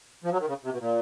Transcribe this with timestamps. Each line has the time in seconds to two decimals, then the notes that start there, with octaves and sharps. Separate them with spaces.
0.24 F3
0.32 F#3
0.40 D#3
0.48 C#3
0.64 C3
0.72 B2
0.80 A#2